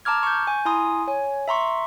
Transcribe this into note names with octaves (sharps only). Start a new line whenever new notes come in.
A5 A#5 D6 F6 G#6
C#6 G6
G#5
E4 G#5 A#5 C6 D#6
C#5 G#5
E5 A#5 C6 C#6